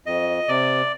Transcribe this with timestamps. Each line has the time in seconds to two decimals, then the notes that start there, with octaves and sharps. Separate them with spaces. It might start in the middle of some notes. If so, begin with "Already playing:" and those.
0.06 F2 D#5
0.48 C3 D5